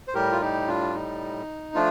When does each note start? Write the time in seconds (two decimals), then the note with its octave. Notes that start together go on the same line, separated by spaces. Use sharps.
0.08 C5
0.14 A2 G3 G4 A#4
0.32 F4
0.41 D#4 G4
0.68 D4 F4
0.95 D#4
1.74 F3 A3 D4 F4